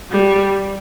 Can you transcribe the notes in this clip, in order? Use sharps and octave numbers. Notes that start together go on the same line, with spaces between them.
G3